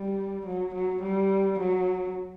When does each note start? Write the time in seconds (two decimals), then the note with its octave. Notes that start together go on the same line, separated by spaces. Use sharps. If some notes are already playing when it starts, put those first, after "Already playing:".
Already playing: G3
0.47 F#3
0.74 F#3
1.03 G3
1.59 F#3